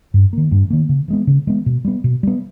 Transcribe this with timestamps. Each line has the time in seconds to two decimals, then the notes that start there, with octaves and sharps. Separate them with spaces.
0.14 G2
0.33 D#3 A#3
0.51 G2
0.70 D#3 A#3
0.89 C#3
1.08 E3 G#3 B3
1.27 C#3
1.47 E3 G#3 B3
1.66 B2
1.85 G3 B3
2.04 B2
2.23 G3 B3